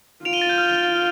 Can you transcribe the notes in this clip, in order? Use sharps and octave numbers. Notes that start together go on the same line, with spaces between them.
F4 D7 F7
D#7 G7
A6
G6
F6